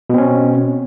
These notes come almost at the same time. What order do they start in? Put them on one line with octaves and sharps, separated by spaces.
B2 C4 C#4